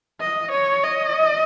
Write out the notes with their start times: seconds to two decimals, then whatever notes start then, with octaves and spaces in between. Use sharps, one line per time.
0.20 D#5
0.51 C#5
0.83 D#5